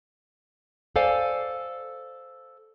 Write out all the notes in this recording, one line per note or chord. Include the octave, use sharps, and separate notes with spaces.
A4 C5 D5 F5 G#5